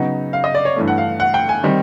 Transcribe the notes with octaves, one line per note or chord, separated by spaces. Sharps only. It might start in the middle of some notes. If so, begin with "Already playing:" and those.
Already playing: C#3 F#3 B3 D#4
F5
D#5
D5
C#5
G2 E3 A3
F#5
F5
F#5
G5
G#5
D#3 G3 C4 D#4